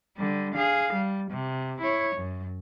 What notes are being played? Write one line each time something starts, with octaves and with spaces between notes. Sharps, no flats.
D3 G3
G#4 F5
G3
C3
E4 C#5
F#2